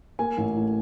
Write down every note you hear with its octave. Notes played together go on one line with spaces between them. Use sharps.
A#3 G#5
A1
A2